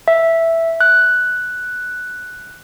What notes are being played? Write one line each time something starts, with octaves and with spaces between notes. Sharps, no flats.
E5
F#6